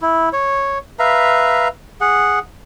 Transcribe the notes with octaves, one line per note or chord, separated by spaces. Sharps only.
E4
C#5
B4 E5 F5 A#5
G#4 F#5